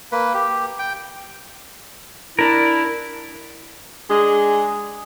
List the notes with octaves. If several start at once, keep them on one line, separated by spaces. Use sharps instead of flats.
A#3 B4
G4
G5
D4 E4 A#4
G#3 D4 G#4